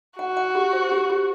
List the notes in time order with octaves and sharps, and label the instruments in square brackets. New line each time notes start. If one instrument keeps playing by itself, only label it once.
[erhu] F#4 [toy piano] F#5
[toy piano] F#5
G4
C5
G4
G4